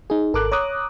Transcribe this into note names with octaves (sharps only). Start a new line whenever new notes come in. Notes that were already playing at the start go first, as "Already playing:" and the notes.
D#4 G#4
G#1 A4 A#4 D6 F#6
C#5 A#5 D6 D#6 F#6